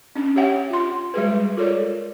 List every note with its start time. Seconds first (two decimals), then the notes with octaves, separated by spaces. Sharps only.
0.16 C#4 D4
0.36 G4 C#5 E5 F#5 G5
0.70 F4 C6
1.14 G3 G#3 F#4 G#4 B4
1.57 F4 A4 A#4 C#5 D5